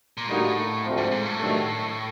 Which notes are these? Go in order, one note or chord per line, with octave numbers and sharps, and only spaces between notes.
A#2
A2 D3 G3 A#3 D#4 F#4
D2 C3 F3
G#2
G#2
A2
G2 D#3 F#3 A3